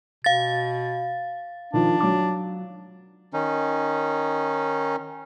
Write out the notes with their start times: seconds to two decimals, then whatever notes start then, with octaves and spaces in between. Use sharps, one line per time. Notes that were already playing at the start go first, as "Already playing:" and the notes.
0.24 B2 F5 A6
1.73 D#3 F3 D4
2.00 F#3 D6
3.33 D#3 C#4 D#4